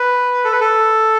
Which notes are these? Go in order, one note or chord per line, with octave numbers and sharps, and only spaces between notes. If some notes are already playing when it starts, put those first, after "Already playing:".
Already playing: B4
A4
B4
A4